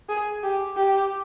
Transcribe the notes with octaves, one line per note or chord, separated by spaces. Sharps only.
G#4
G4
G4